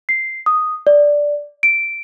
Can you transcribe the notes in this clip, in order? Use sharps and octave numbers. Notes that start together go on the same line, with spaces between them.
C7
D#6
D5
D7